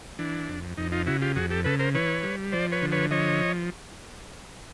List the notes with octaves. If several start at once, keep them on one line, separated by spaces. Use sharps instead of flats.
E3 D4
F2
F2 D#4
D#4 F4
C#3 E4 F#4
F4 G4
F2 F#4 G#4
G4 A4
C#3 A4 B4
A#4 C5
E3 B4 C#5
G3
F3 C5 D5
B4 C#5
D3
B4 C#5
F3 C#5 D#5